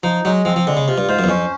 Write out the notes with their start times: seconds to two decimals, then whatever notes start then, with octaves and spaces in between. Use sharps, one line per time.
0.03 F3 D#4
0.25 F#3 G#3
0.45 F3 C4
0.56 F3
0.66 D3 G#3
0.77 C#3
0.88 C3 F4
0.98 G2
1.09 G#2 C5
1.19 F#2
1.24 E2
1.29 F2 C#4